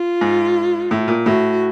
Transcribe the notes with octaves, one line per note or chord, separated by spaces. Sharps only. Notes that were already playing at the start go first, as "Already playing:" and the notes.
Already playing: F4
G#2
A2
A#2
A2 F#4